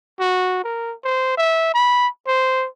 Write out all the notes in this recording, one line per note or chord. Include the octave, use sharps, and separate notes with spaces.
F#4
A#4
C5
E5
B5
C5